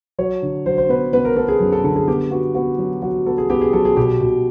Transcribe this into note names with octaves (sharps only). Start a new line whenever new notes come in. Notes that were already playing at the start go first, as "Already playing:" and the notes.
F#3 C#5
D3
F#3 C5
C5
B3 B4
B3 B4
A#4
B3 A4
G#4
F#2
A4
D3 A4
G#4
B3 G4
B3 F#4
B3 F#4
F#3
F#3 F#4
B3 A4
G#4
B3 G4
G#4
F#3 A4
G#4
B2 G4
B2